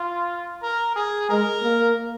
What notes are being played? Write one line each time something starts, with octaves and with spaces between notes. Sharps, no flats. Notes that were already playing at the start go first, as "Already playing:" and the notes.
Already playing: F4
A#4
G#4
G#3 A#4
A#3